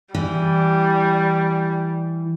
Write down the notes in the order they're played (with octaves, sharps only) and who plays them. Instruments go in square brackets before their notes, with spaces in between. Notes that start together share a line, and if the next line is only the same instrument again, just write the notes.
[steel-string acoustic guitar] E3 [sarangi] G3